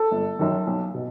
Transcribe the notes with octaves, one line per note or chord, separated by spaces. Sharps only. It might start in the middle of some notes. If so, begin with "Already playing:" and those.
Already playing: A4
G1
F#2 D#3
B1
B2